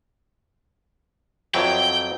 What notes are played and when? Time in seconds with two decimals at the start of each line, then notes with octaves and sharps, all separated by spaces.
1.54 F2 E3 F#3 G5